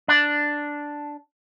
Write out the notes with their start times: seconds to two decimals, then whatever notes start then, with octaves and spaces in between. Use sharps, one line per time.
0.08 D4